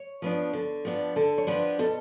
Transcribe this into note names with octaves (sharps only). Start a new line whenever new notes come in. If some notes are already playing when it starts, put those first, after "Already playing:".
Already playing: C#5
F3 B3 D4
D3
F3 B3 D4
D3 A4
C#5
F3 B3 D4 B4
B2 A4